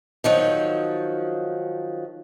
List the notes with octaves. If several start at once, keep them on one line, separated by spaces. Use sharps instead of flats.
D#3 F3 F#3